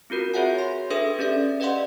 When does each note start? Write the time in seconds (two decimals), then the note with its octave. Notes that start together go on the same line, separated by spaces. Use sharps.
0.10 C4 F4 F#4 A#4
0.34 F#4 G#4 C#5 E5 F#5 G#5
0.58 C6
0.90 D4 G#4 A4 B4 E5 D#6
1.19 C#4 G4 D5 E5
1.60 B4 D5 D#5 F5 F#5 C6